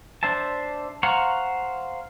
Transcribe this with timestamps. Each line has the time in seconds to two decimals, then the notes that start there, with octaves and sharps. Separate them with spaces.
0.23 D4 C5 E5 A5
1.03 C5 F5 F#5 A#5 C#6